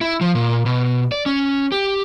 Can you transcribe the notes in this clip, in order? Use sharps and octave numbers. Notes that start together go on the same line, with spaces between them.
E4
F3
A#2
B2
D5
C#4
G4